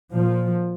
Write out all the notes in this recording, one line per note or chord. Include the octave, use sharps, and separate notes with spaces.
A#2 F3